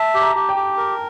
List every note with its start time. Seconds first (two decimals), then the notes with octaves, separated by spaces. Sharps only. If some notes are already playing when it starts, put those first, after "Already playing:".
Already playing: E5 A5
0.14 G4
0.21 A#5
0.35 G4
0.49 G5
0.56 G4
0.77 A#4